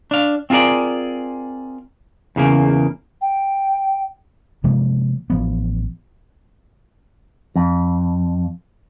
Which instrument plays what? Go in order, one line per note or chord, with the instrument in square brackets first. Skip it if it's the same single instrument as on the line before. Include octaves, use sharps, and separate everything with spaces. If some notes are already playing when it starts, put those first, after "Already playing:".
[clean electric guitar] D4 F5
C4 F4 G#4 A#4 D5
E2 C#3 A#3
[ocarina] G5
[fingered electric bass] C3 F3 G#3 A#3
A1 F3 B3
[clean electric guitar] F2